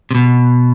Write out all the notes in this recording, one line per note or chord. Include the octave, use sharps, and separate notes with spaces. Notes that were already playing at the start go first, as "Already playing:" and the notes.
C3
B2